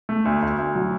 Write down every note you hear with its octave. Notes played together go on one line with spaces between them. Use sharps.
A3
D2
D2
D2
F#3